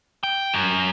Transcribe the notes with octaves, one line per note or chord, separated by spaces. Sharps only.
G5
F#2